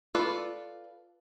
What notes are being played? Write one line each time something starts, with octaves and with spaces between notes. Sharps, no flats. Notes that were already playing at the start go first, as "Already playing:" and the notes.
F4 A4 B4 D5